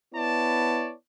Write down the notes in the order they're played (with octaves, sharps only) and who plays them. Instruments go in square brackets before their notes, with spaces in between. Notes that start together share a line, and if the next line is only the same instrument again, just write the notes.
[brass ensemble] B3 E4 C#5 D5 A5